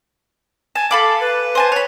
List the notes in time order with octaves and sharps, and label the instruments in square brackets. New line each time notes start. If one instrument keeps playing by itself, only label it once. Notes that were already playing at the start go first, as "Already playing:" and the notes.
[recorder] G#5 [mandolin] A5
[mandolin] A4 B5 D6 [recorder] F5
[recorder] B4
[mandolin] C5 G#5 A5
C#5 B5